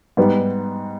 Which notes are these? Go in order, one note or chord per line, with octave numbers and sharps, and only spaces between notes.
G#2 G3 B3 B4